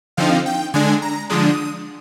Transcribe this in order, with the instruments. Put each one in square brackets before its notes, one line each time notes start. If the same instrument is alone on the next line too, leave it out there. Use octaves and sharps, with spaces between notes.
[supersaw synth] D3 F3 C4 D#4 F5
G5
D3 G#3 D4 G#5
A#5
D3 F3 G#3 D4 D#6